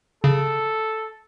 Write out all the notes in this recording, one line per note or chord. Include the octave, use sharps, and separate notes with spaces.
C#3 A4